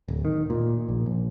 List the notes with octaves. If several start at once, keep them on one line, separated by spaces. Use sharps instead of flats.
D1
D#3
A#2
A#1
A#1